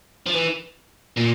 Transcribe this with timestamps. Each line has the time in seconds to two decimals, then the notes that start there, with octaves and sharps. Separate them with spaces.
0.27 F3
0.34 E3
1.18 A#2